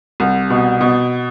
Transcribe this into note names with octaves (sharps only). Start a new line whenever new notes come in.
C2
B2
B2